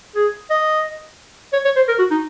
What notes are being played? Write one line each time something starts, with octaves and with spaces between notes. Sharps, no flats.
G#4
D#5
C#5
C#5
C5
A#4
F#4
D#4